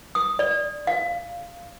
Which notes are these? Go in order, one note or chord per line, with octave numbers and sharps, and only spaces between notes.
D#6
D5
F5